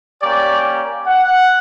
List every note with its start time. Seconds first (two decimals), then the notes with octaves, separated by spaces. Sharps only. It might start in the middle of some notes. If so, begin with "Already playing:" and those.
0.21 A#3 C#4 G4 D5
1.06 F#5